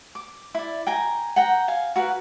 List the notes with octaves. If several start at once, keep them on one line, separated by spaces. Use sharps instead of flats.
D6
E4 D5
G5 G#5 A#5
F#5 G5 A#5
F5 G#5
F#4 A#4 B4